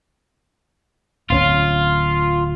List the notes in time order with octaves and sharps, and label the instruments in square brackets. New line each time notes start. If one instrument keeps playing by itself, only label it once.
[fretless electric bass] D1 C4 C#4 [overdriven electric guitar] F4